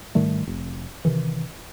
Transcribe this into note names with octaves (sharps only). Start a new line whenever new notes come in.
G#2 D#3 G3 A3
F1
C3 D#3 E3